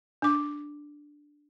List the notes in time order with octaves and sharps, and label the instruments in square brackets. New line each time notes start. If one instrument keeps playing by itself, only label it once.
[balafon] D4 D6